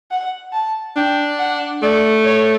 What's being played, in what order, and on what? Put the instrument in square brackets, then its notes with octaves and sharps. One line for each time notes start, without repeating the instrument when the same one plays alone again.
[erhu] F#5
A5
[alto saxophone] D4 [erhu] G5
[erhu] F#5
[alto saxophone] A3 [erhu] D5
[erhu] C#5